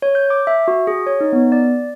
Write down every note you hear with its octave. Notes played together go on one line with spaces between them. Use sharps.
C#5
G6
D6
E5
F#4
G#4
C#5
D#4
B3
D5